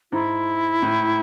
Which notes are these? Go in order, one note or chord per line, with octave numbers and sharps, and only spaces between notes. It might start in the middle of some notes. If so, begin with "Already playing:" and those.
G#2 E4
A2